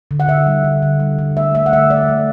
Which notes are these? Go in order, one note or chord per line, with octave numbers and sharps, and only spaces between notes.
D3
F#5
D3 E5
G3
D3
D3
G3
D3
A3 E5
A3 E5
F#5
D3 E5
A3 D5
A3